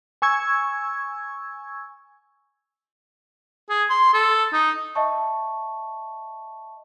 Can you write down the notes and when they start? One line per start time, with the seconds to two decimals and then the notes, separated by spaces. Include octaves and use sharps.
0.22 G#5 C#6 E6 G#6
3.69 G#4
3.90 C6
4.13 A4
4.52 D#4
4.95 D#5 E5 A5 C#6